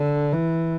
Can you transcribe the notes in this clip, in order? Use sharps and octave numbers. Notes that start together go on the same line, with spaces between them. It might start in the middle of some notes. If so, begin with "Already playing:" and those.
Already playing: D3
E3